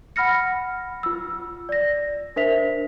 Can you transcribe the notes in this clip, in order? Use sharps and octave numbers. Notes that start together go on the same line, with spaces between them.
F#5 B5 F6 A#6 C#7
F4 E6
D5 A#6
D4 A#4 C5 E5 B6 F7